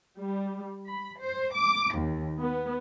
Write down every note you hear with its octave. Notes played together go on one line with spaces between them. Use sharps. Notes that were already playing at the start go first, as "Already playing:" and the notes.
G3
B5
C5
D6
D#2
B3